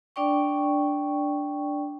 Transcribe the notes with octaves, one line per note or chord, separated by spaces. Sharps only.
D4 D5 G5 C#6